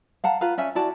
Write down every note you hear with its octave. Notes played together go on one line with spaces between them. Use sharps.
F5 F#5 A5 A#5
F4 B4 F5 A#5
C#4 D5 E5 G#5
E4 F#4 D5 A5